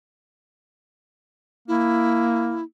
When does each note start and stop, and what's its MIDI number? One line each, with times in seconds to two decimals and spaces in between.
1.68 2.62 58
1.68 2.63 64